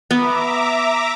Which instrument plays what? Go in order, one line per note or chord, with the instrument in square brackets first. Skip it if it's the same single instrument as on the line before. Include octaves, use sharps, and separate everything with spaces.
[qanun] B3 [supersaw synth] E5 A#5 D6